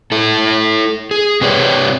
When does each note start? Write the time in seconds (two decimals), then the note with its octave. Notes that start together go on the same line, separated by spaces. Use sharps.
0.12 E4 A4
1.11 G#4
1.41 C3 C4 G4 B4 C#5 D5